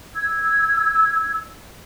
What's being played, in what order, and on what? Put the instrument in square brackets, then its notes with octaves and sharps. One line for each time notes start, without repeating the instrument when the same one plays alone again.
[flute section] E6 G#6